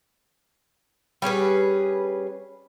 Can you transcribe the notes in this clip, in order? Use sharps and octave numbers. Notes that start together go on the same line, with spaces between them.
G3 C#4 G#4 B4